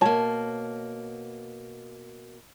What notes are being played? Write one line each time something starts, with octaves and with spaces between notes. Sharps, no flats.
B2 A#3 C#5 A5